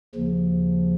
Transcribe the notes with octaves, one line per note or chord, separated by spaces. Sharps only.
D#2 C#3 F3